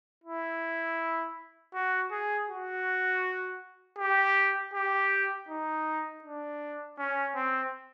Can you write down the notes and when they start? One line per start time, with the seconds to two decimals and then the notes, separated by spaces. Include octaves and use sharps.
0.24 E4
1.74 F#4
2.11 G#4
2.49 F#4
3.98 G4
4.74 G4
5.49 D#4
6.24 D4
6.98 C#4
7.36 C4